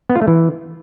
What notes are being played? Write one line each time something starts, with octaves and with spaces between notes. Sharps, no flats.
B3
F4
A3
E3